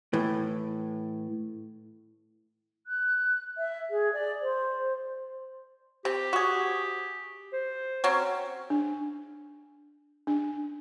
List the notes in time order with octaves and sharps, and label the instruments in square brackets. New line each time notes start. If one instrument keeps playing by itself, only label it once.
[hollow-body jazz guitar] A2 E3
[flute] F#6
E5
G#4
D5
C5
[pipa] C4 [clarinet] G4
[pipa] F#4 G#4
[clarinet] C5
[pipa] F#3 C4 C#4
[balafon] D4
D4